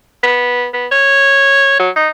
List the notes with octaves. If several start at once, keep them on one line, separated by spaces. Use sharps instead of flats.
B3
B3
C#5
F#3
D#4